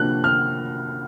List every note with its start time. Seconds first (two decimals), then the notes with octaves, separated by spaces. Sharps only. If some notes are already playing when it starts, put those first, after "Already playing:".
Already playing: C3 F3 A#3 D4 F#4 F#6
0.24 F6